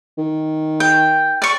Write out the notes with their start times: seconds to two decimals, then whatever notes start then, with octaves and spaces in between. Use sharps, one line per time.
0.18 D#3
0.80 G5
1.42 D5 C#6